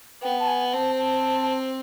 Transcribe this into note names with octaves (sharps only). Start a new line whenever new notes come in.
B3 G5
A5
G#5
C4 A5
A5